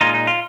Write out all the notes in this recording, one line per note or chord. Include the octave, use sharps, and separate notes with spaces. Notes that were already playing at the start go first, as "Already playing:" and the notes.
A#2 G#3 D#4 F4
D#4
F4